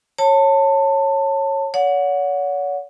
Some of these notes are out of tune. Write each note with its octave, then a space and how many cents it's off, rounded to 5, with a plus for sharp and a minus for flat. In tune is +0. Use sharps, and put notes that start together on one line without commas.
C#5 -15 A5 +20
C#5 +40 F#5 -20